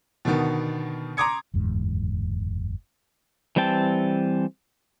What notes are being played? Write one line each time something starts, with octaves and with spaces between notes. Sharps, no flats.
B2 D3 D#3 B3
A#5 C6 D6 D#6 G#6 C#7
F#1 E2 G#2 D3
E3 G3 C4 G5 A5